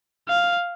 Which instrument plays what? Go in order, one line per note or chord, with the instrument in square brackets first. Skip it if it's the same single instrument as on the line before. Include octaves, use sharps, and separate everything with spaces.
[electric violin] F5